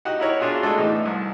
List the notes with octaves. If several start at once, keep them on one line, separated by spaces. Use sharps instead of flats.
D#4 F#4 G4 F#5
D#4 E4 A#4 C#5
D4 F4 F#4 G#4
G#3 A3 D4 F#4 A4
A2 E3 D#4
C2